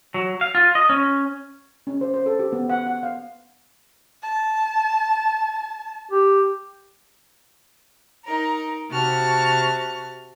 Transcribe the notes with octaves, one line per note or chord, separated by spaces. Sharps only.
F#3
F5
F4
D#5
C#4
C#4
C5
C5
A4
G4
B3
F#5
F#5
F5
A5
G4
D#4 A#4
C3 F#4 A5 F6